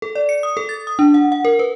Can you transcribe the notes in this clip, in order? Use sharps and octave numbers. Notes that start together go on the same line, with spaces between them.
A4
D5
C#7
D#6
A4
A6
D#6
D4
F#5
F#5
A#4
B4